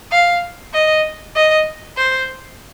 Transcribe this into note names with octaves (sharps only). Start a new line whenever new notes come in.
F5
D#5
D#5
C5